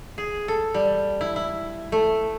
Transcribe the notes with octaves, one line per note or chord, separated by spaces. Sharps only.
G#4
A4
G3
E4
E4
A3